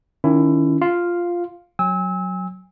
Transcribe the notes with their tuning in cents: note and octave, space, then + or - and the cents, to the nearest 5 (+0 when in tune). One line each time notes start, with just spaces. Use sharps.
D#3 +0 C#4 +20 E4 +20
F4 +0 F5 +0
F#3 +0 G#5 -35 E6 -30